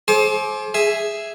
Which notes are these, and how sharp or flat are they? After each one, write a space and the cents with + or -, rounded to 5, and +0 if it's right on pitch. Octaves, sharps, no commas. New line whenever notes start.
G#4 +45 C5 +25 D6 +0
G#4 +0 E5 +0